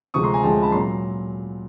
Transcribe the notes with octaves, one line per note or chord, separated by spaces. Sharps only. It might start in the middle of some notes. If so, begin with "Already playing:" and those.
D2 C3 F3 G#3 C#6 D#6
A#5 C6
G#5 A#5
D2 C3 F3 G#3 G5 A5
A5 B5
A#2 F#3 A#5 C6